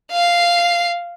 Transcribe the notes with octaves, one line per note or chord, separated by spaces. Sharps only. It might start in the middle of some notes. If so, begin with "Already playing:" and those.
F5 C7